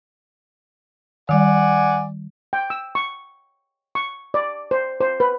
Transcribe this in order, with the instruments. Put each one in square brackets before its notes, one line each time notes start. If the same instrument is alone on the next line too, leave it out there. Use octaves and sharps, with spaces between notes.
[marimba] D#3 G3 [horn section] D5 F#5 G#5
[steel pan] G5
E6
C#6
C#6
D5
C5
C5
B4